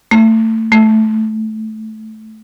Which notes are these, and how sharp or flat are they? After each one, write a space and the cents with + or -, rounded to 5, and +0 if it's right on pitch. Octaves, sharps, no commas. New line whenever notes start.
A3 +25
A3 -10